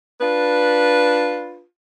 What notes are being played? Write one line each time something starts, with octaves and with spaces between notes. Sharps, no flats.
D4 F4 B4